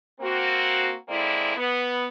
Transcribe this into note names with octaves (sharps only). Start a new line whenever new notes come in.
A#3 C4 F#4
D3 G#3 A#3 C4 E4 D5
B3